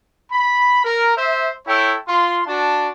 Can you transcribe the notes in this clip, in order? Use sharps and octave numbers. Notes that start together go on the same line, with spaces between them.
B5
A#4
C5 E5
E4 A4 C#5 G5
F4 C6
D4 F#4 A5